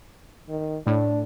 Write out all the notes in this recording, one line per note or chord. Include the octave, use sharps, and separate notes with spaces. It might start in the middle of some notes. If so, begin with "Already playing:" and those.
D#3
A2 D4